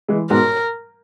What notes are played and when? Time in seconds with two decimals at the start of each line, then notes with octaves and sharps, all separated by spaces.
0.08 E3 G#3
0.30 G#2 B2 A#4